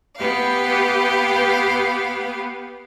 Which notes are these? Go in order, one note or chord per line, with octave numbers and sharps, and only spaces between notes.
B3 G4 B4 F5